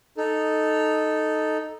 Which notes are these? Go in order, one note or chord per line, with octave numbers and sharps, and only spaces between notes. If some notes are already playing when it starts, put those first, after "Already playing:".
D#4 A4